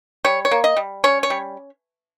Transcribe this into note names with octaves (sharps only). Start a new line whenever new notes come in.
G3 C#5
C#5
A#3
D#5
G3
C#4 C#5
C#5
G3